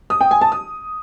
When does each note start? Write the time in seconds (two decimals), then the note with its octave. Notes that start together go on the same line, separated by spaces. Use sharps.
0.10 D#6
0.21 G5
0.31 G#5
0.41 A5
0.52 D#6